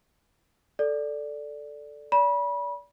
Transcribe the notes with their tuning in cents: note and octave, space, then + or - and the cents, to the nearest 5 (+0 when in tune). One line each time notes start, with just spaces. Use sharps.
A4 +0 D5 +0
D5 -35 B5 -30